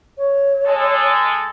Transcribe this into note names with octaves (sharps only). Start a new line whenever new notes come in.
C#5
G#3 A4